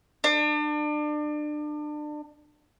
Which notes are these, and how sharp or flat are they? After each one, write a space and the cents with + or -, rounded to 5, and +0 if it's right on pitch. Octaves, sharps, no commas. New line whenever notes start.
D4 +30